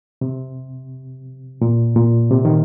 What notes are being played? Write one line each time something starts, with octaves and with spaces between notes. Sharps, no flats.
C3
A#2
A#2
C3
D#3